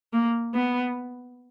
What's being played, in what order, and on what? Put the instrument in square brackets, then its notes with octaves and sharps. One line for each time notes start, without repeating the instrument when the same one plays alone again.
[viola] A#3
B3